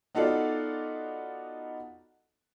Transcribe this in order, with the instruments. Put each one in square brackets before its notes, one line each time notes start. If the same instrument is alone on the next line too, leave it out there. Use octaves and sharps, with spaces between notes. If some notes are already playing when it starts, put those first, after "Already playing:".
[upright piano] B3 D#4 F4 F#4 A4 D5